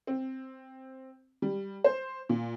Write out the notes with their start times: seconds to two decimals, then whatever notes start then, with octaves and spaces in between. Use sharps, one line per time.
0.07 C4
1.42 G3
1.84 C5
2.29 A#2